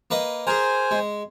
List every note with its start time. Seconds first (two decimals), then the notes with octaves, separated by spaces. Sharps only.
0.11 A#3 B4 D#5
0.47 G#4 A#4 C5 G#5
0.91 G#3